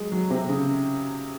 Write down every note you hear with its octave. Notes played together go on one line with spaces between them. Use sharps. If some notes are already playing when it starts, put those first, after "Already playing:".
Already playing: F#3 G#3
F#3
C3
C#3